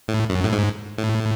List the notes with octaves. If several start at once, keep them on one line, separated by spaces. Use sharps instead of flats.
A2
F#2
A2
G#2
A2